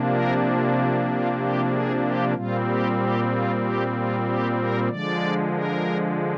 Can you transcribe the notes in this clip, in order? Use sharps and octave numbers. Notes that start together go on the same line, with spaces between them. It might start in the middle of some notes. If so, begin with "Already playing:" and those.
Already playing: C3 F3 A#3 D4
A#4
F4
G4
G#4
G4
A#2 G3 C4 F4
G4
G4
F4
G4
F4
G4
A#4
D3 F3 G#3 D5
A#4